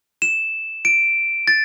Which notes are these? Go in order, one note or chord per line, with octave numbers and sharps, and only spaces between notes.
E7
D7
A6